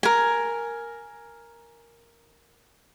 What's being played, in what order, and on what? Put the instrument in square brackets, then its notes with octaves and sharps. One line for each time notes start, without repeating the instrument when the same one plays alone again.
[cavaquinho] A#4 G#5